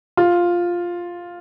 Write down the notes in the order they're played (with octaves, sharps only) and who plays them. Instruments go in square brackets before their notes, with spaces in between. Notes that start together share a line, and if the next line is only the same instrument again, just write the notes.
[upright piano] F4